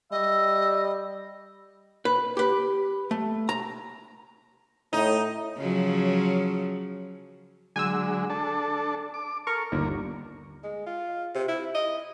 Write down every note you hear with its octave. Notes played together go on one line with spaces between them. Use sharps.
G3 D#5 E5
B4
G4 B4
A3
A#5
A2 D#4
C#3 F3 F#3
D3 F#3 G#3 G#5 E6
D4 A4 A5
D6
A4 A#4 C#6
G1 D#2 D3 A#4
G#3
F4
C3
E4
D#5